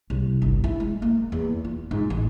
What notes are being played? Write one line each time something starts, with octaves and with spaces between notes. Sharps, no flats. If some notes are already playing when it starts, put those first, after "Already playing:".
C2
G1
E4
G#3
A#3
E2
F4
G#2
A1